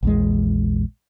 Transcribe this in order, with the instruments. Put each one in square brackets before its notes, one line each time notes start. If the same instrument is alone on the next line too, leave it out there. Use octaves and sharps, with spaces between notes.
[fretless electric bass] A#1 E2 G#3